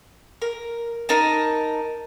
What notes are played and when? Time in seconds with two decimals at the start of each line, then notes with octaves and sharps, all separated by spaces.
0.42 A#4
1.09 D#4 A#4 A5